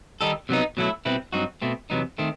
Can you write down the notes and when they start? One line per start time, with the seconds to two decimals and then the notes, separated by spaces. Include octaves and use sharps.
0.21 D#3 G3 D#4 A4
0.49 C3 F#3 B3 D#4
0.77 B2 F#3 A3 E4
1.05 B2 G3 C4 E4 B4
1.33 G2 F#3 C4 D#4 F#4
1.62 B2 A3 C4
1.90 E2 C3 F#3 B3 D#4
2.18 D#3 A3 C4